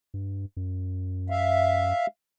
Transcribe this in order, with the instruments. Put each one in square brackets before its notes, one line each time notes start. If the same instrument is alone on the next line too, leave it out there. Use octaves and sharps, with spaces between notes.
[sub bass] G2
F#2
[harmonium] E5 F5